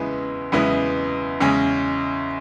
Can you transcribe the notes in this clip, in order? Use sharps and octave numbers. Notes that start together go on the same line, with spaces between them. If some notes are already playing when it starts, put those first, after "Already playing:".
Already playing: E2 C#3 G#3 B3 E4
E2 C#3 G#3 B3 E4
E2 C#3 G#3 C#4